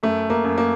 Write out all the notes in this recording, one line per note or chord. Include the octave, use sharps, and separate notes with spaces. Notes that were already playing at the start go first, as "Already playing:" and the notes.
F#2 A3
A#3
F#2
A#3